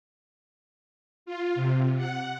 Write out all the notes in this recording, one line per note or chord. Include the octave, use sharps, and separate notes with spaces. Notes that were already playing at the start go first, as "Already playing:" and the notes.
F4
C3
F#5